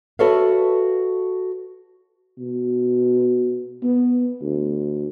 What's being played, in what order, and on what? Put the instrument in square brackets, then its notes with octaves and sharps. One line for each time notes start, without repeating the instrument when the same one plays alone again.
[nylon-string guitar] F#4 A4 B4 C#5 E5 F5
[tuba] B2
B3
D2